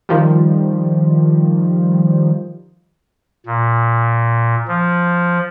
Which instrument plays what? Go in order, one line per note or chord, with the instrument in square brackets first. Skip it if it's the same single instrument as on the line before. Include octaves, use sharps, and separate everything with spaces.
[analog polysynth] D#3 F3 G3
[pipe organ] A#2
F3